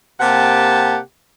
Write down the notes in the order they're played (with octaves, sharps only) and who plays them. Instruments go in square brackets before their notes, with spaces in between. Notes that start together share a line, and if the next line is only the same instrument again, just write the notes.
[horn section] C3 A#3 G4 F#5 G5 A5